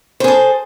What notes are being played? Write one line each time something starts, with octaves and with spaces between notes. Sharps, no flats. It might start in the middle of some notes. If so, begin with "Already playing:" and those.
G#4 A4 C5